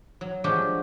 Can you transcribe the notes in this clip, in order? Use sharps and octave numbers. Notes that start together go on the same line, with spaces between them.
F#3
F3 F#3 G#3 D4 F#4 G4